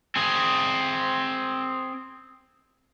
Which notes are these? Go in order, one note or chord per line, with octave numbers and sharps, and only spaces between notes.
C4 G#4